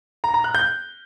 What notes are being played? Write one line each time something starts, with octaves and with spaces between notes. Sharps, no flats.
A#5
A#5
F#6
G6